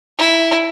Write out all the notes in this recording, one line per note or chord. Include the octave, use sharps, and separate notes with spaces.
E4